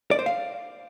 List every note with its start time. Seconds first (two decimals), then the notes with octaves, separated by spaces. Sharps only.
0.11 D5
0.19 C5
0.26 F5